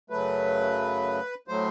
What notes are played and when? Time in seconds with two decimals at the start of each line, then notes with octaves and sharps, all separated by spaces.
0.10 F#2 C#3 F#3 A3 B4
1.48 A2 F#3 A3 C5